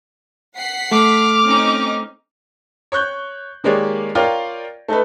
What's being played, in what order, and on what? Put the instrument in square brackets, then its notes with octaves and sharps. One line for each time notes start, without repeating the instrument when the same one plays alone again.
[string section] F#5 B6 C7
[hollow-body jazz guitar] A3 [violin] D6 F6
[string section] C4 C#4 D#4
[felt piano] C#5 C#6 F#6 G6
D#3 G#3 A#3 G4 C#5 D5
F4 A#4 C#5 D5 F5 G5
A3 D#4 A4 B4